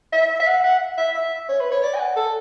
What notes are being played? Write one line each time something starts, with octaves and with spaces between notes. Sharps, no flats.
E5
E5
F#5
F#5
E5
E5
C#5
B4
C#5
D5
G#5
F#5
A4